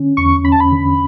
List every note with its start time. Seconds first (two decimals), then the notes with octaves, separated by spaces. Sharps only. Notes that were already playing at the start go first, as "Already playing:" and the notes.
Already playing: D3 C#4
0.17 E2 C#6
0.44 C#4 B5
0.52 A5
0.60 B5
0.72 D3